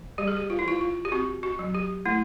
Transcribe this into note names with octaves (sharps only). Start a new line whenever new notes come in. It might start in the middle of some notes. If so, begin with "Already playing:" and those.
Already playing: E3
G3 G4
G#4
G4
F4
E4
E3 F4
F4
G4
C4 F#4
F#4
F#3
G4
A3 E4